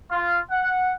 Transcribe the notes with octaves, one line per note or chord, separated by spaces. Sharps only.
F4
F#5